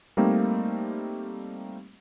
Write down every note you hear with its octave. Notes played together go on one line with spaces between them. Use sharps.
G3 A3 A#3 C4 D#4